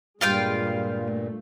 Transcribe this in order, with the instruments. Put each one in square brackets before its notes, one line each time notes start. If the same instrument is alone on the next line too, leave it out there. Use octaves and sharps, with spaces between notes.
[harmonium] G2 A#2 [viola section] G3 G#3 [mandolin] F4 F5 G5
[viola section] A3